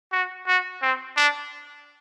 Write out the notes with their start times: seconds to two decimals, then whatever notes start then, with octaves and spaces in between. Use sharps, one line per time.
0.12 F#4
0.47 F#4
0.82 C4
1.17 D4